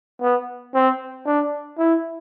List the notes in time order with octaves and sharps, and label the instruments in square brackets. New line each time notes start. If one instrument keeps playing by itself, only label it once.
[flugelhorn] B3
C4
D4
E4